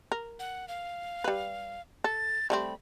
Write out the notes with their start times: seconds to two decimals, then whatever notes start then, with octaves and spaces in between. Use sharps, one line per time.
0.12 A#4
0.39 F#5
0.68 F5
1.24 G3 B4
2.04 A4 A6
2.50 G3 A3 C4 B5